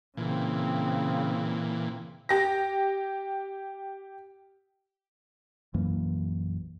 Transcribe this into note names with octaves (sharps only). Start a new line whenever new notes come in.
A#2 C#3 E3 C4
G4 A#6
A#1 F#2 E3 A#3